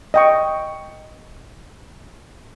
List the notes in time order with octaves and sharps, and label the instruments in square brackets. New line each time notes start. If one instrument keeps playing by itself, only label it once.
[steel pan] D#5 G5 C#6